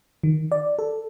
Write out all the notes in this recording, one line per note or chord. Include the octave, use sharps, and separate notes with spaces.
D#3
D5
A4